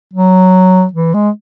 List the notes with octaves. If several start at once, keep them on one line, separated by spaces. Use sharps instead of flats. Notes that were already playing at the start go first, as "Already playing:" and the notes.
F#3
E3
G#3